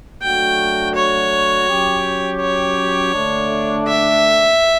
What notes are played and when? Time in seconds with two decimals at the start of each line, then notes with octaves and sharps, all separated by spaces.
0.22 F#3 A3 D4 F#4 G5
0.95 C#5
1.69 F#3 C#4 G4
2.41 C#5
3.14 D3 A3 D4
3.87 E5